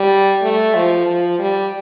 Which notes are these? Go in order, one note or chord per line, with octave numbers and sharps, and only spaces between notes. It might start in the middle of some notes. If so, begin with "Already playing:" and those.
Already playing: G3
A3
F3
F3
G3